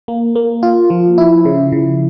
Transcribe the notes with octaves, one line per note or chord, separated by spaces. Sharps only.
A#3
A#3
F4
F3
E4
C#3
C#3